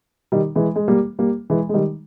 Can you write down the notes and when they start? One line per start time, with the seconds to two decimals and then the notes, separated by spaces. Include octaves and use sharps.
0.32 D#3 G3
0.55 E3 G#3
0.76 G#3
0.88 G3 A#3
1.19 G3 A#3
1.50 E3 G#3
1.69 G#3
1.74 D#3 G3